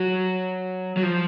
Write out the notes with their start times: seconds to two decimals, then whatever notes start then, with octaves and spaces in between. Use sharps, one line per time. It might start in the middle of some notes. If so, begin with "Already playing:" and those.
Already playing: F#3
0.97 F#3
1.03 F3